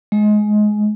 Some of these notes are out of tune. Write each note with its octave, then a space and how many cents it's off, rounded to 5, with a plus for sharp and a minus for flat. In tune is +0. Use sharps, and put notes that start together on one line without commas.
G#3 +20